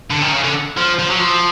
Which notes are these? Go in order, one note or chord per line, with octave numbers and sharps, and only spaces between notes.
D3
D#3
C#3
D3
F3
F3
F#3
F3